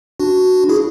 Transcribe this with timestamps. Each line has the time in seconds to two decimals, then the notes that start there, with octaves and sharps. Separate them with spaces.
0.20 D4 F#4
0.69 E4 G#4